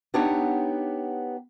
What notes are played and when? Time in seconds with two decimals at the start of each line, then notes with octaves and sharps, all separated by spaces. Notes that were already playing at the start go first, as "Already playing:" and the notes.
0.14 B3 D4 D#4 G4 C#5 F#5